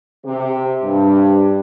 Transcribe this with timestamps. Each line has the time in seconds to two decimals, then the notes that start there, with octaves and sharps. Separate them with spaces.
0.24 C3
0.82 G2